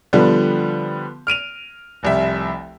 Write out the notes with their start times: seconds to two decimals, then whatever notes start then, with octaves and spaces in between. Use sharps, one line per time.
0.13 D3 F3 G3 B3
1.27 F6 D7 D#7 F7
2.03 F1 C2 E5